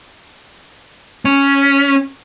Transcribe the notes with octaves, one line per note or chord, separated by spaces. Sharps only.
C#4